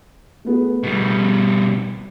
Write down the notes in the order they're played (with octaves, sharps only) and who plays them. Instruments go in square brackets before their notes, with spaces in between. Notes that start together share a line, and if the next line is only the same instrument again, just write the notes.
[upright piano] A3 B3 G#4
[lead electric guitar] B2 G3